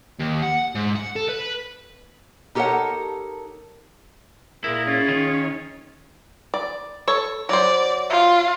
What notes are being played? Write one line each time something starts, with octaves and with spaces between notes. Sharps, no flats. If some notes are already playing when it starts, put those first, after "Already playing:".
D#2
F#5
G#2
F#5
A4
B4
D#4 G4 A4 A#4 C#5 F#5
A#2 E4 G#4 A#4
C#4 F4
D#3
D5
A4 C#5
F#3 C5 D5
F4